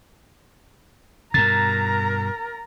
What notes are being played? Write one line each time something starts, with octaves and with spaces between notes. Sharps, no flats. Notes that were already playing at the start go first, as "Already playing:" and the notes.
G2 B2 A#4 A#5 A6